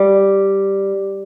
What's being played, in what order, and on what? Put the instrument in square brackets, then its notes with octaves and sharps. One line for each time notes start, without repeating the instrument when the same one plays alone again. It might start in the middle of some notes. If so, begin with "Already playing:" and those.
Already playing: [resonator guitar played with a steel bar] G3